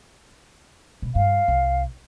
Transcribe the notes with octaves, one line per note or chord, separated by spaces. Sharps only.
B2
G2 F5
C2